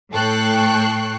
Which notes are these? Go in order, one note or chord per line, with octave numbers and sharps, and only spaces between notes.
A2 A4 G5 C#6 F#6 C7